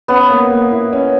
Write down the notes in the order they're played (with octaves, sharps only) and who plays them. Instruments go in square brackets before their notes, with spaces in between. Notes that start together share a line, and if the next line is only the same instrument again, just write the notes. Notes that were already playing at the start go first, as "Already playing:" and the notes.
[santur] B3 [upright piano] C#4
[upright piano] A#3
A#3
E4
C#4